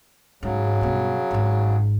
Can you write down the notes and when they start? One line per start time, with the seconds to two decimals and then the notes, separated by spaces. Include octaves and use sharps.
0.43 G#2 C#3 F#3
0.81 G2 B2
1.31 G#1 G#2